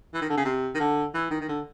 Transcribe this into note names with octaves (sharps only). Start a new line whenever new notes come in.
E3
D#3
D3
C#3
C3
D#3
D3
E3
D#3
D#3
D3